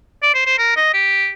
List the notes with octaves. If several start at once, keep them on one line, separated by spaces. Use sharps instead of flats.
D5
C5
C5
A#4
D#5
G4